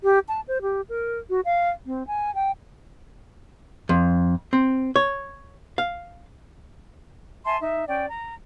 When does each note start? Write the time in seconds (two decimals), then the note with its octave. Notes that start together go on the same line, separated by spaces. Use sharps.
0.03 G4
0.28 A5
0.48 C5
0.62 G4
0.89 A#4
1.30 F#4
1.45 F5
1.86 C4
2.07 G#5
2.35 G5
3.89 F2
4.53 C4
4.96 C#5
5.78 F5
7.44 E5 G#5 A5 C6
7.60 D#4 E5
7.88 C#4 D5 G5
8.08 A#5